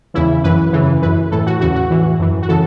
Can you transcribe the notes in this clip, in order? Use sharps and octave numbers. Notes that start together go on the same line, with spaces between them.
E2 C#3 E3 E4
F#2 E3 B4
F#2 C#3 E3
F#2 E3 B4
A2 E3 A4
F#4
E2 C#3 E3 F#4
F#4
A2 E3
F#2 E3
F#4
C#3 E3 A4